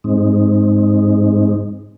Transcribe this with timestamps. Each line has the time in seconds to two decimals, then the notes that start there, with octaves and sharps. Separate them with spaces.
0.04 G#2 G#3 C4 D#4